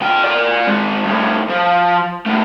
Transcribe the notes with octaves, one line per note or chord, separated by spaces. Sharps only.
F3 G5
A#4 D5
G#3 C4
C2 A2
F3
B2 A3